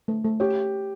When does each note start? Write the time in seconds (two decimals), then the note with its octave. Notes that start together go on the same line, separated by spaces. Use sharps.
0.08 A3
0.25 A3
0.40 G4 C#5